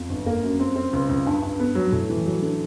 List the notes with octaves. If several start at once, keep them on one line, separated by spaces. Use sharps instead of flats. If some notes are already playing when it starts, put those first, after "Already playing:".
Already playing: F2
G1
A#3
F#2
C4
C4
C#2
C#2
G2
G2
B3
F#3
A2
E3
F#3
D3